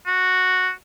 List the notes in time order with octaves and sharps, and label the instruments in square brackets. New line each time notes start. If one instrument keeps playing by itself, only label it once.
[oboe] F#4